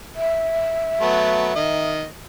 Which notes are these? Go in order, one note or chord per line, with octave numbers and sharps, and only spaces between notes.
E5
F#3 A3 B3
D#3 D#5